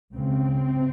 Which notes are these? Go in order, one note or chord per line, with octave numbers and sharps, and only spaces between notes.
C#2 C#3 C4